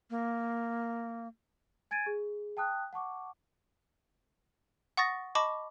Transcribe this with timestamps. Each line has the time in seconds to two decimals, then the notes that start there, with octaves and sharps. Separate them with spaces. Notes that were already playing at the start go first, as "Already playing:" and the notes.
0.10 A#3
1.91 G#5 G#6 A6 D7 D#7
2.06 G#4
2.57 G5 A5 D#6 F#6
2.93 F#5 A5 C#6 D6
4.97 F#5 C#6 D#6 A6 A#6
5.35 D#5 A5 B5 C#6 D6